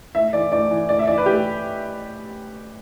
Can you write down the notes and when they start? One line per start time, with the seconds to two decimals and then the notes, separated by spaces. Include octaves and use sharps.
0.15 A2 E5
0.33 E3 D5
0.52 A2 D5
0.71 E3
0.89 A2 D5
0.99 E5
1.08 E3 D5
1.18 B4
1.26 A2 G4